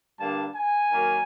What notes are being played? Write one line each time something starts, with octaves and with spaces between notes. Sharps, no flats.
G2 D3 G3 A#3 A5
G#5
D#3 F#3 A#3